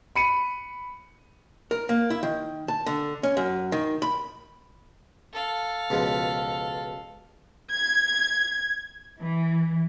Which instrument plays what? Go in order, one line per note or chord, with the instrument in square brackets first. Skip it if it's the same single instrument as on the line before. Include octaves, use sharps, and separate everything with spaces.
[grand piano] B5 C#7 D#7
[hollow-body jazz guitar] A#4
A#3
E4
D#3
A5
D3
C#4
F#2
D#3
B5
[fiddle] A4 F5
[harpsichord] C#2 B2 F3
[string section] G#6
E3